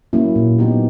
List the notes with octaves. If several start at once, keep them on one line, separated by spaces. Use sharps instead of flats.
F#3 A#3 C#4 E4
A#2
F#3 B3 D#4 G4